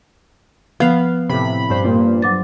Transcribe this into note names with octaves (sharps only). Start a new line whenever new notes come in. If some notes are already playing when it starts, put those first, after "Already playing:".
F3 B3 F5
A2 C3 B5
G2 C5
A#2
F#3 D6 A6